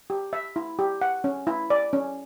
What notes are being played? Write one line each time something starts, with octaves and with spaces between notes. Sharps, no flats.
G4
E5
E4
G4
F#5
C#4
E4
D5
C#4